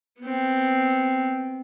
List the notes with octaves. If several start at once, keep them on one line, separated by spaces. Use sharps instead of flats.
B3 C4